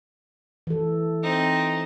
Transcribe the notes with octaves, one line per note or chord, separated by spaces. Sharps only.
E3 A4
C4 D#4